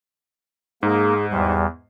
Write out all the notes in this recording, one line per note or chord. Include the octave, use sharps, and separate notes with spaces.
G#2 A#3 G#4
E2 G3